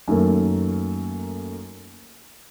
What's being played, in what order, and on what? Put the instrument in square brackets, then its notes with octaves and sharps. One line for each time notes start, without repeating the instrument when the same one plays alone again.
[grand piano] F#2 D#3 A3 A#3